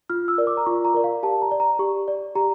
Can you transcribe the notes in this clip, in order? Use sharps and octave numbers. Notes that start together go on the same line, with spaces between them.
F4 F6
E6
A#4 D5
D6
A#5
F4 C#6
A#5
A#4 D5
F5
G4 A5
A#5
D5
A#5
G4 C#6
D5
G4 A#5